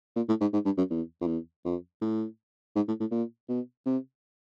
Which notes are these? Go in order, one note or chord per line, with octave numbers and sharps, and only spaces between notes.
A#2
A2
G#2
G#2
G2
F#2
E2
F2
E2
F2
A2
G#2
A2
A2
A#2
B2
C3